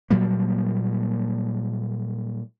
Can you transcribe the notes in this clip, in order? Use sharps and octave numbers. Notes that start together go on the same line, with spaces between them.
A#2 F#3 G3 A#3